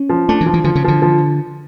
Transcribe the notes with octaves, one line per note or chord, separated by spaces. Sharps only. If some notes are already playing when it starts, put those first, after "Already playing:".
Already playing: C#4
F3
A3 D4
E3
F3
E3
D3 F3
C#3
D3 F3
F3